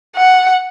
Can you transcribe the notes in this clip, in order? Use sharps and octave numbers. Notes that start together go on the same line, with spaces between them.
F#5